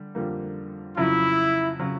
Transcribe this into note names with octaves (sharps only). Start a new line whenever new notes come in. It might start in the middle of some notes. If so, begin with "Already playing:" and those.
Already playing: D3 G3
F2 D3 G3 A#3
F2 C#3 F#3 E4
C#3 F#3